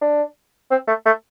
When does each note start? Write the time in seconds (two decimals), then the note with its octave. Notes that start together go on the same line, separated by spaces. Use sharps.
0.02 D4
0.71 C4
0.87 A3
1.06 A3